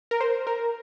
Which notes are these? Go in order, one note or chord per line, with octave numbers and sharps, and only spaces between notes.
A#4
C5
A#4